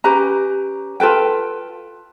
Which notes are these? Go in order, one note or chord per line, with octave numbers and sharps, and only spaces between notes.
C#4 G4 B4 A#5
F4 A4 B4 G5